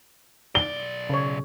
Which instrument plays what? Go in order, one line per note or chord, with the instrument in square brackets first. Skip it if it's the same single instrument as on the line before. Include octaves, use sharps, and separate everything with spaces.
[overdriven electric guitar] B1 D5 [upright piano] G7
[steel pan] C#3 C#5